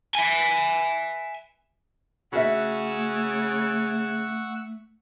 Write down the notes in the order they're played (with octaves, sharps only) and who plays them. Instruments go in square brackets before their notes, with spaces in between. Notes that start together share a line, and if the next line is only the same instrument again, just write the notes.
[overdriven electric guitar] E5 G#5
[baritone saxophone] C#3 [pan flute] A3 [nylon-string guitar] F#4 E5 [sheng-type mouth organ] F#5 C#6 E6